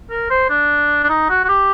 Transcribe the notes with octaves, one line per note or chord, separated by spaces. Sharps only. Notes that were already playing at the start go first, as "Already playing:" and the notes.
A#4
C5
D4
D4
D#4
F#4
F#4
G4